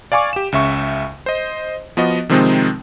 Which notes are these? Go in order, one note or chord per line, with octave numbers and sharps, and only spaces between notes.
D5 F5 G#5 C#6 D6
G4 E7
C#2 C#3 E5 C#6
C5 D#5
F3 B3 F#4 D#5
C3 D#3 F3 G#3 C4 D#4